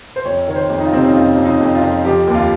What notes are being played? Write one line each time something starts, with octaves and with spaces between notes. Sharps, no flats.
C5
F2 C#5
D#3 C#5
C5
F2
D#4
F4
C3 C4
C#4
D#4
F2 F4
F2
D#4
F2
F4
F2
F3 G4
D#2
F4